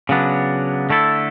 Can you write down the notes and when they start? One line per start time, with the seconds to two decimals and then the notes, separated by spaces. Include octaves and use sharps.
0.09 C#3 F#3 B3 D4
0.90 D3 A3 E4 A4